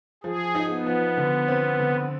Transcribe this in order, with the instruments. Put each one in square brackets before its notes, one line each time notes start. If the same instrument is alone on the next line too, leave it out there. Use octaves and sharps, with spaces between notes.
[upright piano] F3 [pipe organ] G#4
[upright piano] D#4
[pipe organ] B3
[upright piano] F3
D3
C4
D3